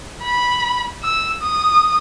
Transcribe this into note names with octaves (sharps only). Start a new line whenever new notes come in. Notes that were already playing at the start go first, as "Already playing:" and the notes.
B5
E6
D#6